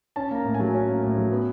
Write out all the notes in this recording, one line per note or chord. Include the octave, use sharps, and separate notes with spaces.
C#4 A5
A#3 A#5
A2
G#5
F#3
C#4
A#3
A2
F#3
B3